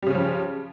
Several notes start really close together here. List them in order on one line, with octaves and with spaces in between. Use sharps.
G3 C#3 C#4 F3